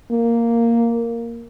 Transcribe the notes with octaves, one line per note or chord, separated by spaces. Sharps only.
A#3